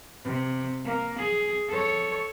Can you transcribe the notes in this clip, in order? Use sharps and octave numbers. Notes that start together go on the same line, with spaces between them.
C3
A#3
G#4
A4 C#5